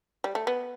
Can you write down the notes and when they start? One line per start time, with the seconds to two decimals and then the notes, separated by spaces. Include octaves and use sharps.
0.24 G3
0.35 A3
0.47 B3